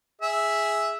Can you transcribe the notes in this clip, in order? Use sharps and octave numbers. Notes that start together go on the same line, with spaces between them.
G#4 E5